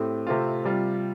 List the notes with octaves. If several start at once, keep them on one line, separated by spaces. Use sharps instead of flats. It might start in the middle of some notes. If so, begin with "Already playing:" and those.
Already playing: A2 A3 C4 G4
C3 A3 C4 F4
C3 G3 F4